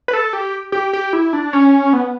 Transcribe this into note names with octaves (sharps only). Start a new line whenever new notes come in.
B4
A4
G4
G4
G4
E4
D4
C#4
B3